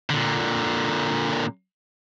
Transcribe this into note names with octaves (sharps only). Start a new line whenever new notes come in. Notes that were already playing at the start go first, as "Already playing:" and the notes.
A#2 D3